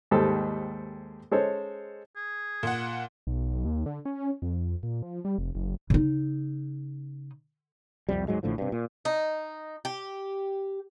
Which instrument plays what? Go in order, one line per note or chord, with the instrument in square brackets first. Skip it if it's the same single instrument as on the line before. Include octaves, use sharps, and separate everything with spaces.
[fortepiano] D#2 G#2 G3 A4 C5
G#3 C#4 A4 C5 C#5
[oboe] G#4
[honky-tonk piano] A#2 F#5
[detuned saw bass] B1
D#2
D3
C#4
F2
A#2
F3
G3
F1
F#1
[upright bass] C#3 D#4
[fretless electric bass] C2 F2 C3 G3
D1 G#2 F#3 G#3
A1 A2 D3 F3
G2 C3
A#2
[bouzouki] D#4
G4